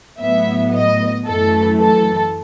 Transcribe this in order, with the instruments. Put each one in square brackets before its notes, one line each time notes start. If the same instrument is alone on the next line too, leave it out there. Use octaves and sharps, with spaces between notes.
[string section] A2 F#3 B3 E5
D#5
F#2 E3 A3 A4
A4